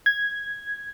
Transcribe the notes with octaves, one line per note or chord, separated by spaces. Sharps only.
G#6